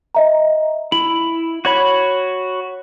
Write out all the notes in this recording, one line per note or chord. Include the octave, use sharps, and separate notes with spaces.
D#5 E5 A#5
E4 F#7
F#4 C#5 B5